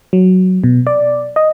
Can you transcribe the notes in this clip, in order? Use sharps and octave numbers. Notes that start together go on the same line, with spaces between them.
F#3
B2
D5
D#5